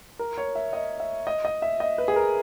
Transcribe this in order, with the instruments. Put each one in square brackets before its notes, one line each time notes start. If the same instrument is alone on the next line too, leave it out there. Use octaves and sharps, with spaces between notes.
[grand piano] A#4
C#5
E5
D#5
E5
D#5
D#5
E5
D#5
B4
G#4
A#4